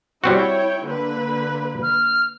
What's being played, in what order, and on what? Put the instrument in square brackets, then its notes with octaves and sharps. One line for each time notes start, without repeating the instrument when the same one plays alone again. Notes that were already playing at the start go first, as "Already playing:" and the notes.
[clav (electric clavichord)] G3 C4 F#4 [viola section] E4 C#5 G5
[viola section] D3 A#3 B4
[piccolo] F6